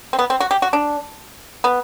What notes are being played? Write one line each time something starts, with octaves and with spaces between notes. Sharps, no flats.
C4
B3
C4
F#4
G4
F#4
D4
B3